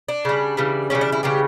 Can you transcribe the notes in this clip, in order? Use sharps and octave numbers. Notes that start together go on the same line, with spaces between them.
D4
C#3 G3
C#3 E3 G3
C#3 E3 G3 C#4
D4
E4
C#3 E3 G3 G4